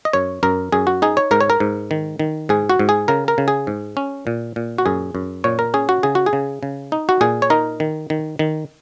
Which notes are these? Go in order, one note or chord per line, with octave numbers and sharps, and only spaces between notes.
D#5
F#2 C#5
F#2 A#4
F#2 G#4
F#4
D#4 G#4
C#5
G#2 A#4
C#5
A#4
G#2
D#3
D#3
G#2 G#4
F#4
G#2
G#4
C#3 A#4
A#4
C#3
G#4
G#2
C#4
A#2
A#2
F#4
F#2 G#4
F#2
A#2 C#5
A#4
C#4 G#4
F#4
C#3 G#4
F#4
G#4
C#3
C#3
D#4
F#4
A#2 G#4
C#5
D#4 A#4
D#3
D#3
D#3